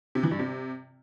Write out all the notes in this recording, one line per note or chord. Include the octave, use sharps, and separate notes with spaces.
C3
E3
G2
C3